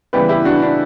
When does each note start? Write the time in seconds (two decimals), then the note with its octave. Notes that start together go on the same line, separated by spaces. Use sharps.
0.13 C#3 E3 G3 B3 G4 B4
0.29 E4 G4
0.45 D4 F#4
0.62 D4